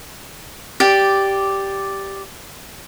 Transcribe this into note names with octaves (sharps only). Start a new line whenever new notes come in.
G4 D5